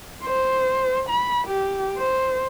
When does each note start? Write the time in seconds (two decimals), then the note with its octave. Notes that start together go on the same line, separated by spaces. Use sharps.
0.24 C5
1.09 B5
1.47 G4
1.97 C5